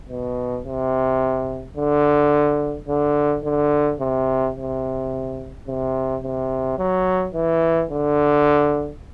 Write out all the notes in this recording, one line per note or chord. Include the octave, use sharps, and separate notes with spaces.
B2
C3
D3
D3
D3
C3
C3
C3
C3
F#3
E3
D3